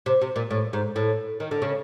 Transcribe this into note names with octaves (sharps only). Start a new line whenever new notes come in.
C3
C3
A#2
A2
G#2
A2
D#3
D3
C#3